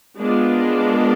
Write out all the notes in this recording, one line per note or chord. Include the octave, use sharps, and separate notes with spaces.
G#3 B3 D4 F4 A#4